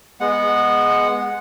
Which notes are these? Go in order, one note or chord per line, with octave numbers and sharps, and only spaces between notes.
G#3 B3 F#5